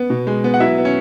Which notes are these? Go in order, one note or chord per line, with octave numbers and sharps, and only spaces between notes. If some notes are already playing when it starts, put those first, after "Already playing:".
Already playing: B3
B2
G#3
B3
F#5
F#3 E4 E5
B3
C#4